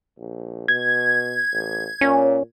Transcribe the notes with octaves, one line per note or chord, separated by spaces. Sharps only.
A#1
B2 G#6
A1
A#2 C#4